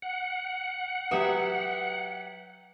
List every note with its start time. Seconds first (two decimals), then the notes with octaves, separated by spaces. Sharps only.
0.02 F#5
1.11 F#3 G4 B4 E5 D#6